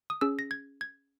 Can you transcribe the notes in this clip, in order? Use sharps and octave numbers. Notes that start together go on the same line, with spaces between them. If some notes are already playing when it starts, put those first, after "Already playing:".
D#6
C#4 G#4 E6
A#6
G#6
G#6